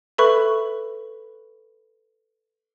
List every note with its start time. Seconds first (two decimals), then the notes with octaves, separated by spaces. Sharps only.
0.18 A4 B4 E5 B5 C#6 F#6